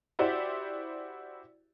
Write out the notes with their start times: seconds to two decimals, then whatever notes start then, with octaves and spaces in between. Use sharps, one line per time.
0.19 E4 F#4 G4 C5 D5